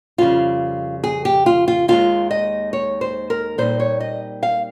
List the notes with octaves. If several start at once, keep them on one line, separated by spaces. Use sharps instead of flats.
F2 C#3 G3 F4
G#4
G4
F4
F4
D#2 D#3 G#3 F4
D#5
C#5
C5
A#4
A#2 G3 C4 D#4 C5
C#5
D#5
F5